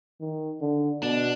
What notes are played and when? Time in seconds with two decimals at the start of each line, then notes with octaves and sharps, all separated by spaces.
0.21 D#3
0.61 D3
1.03 B2 D4